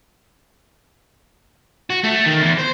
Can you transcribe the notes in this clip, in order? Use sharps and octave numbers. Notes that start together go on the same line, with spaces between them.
F#4
A3
D#3
E2
C5